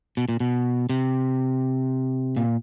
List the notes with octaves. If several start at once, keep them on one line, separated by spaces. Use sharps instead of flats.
B2
A#2
B2
C3
A#2